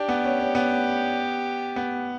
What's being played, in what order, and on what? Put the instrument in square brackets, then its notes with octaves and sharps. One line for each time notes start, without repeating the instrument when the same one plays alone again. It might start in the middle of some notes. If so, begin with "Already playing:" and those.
Already playing: [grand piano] D4 [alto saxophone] G4
[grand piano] B3
C#4
C#4
B3
B3